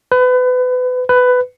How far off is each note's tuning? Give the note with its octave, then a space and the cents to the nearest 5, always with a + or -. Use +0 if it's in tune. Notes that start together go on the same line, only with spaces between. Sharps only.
B4 +30
B4 +15